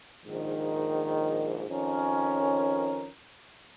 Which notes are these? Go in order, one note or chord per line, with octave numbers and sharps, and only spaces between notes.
A#1 G#2 D#3
F2 D#3 C#4 A#4